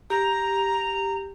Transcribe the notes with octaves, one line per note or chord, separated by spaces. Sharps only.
G4 A#5